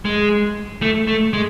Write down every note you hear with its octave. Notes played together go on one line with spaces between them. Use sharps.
G#3
A3
A3
G#3